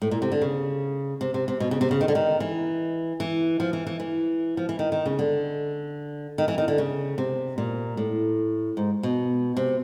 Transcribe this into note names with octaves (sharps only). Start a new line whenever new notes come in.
A2
A#2
C3
D3
C#3
C3
C3
C3
B2
C#3
C3
C#3
D#3
D3
D#3
E3
E3
F3
E3
E3
E3
F3
E3
D#3
D#3
C#3
D3
D#3
E3
D#3
D3
C#3
C3
A#2
A2
G#2
B2
C3